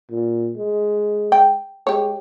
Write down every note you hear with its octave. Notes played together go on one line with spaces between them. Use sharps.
A#2
G#3
G5
G#3 G4 C#5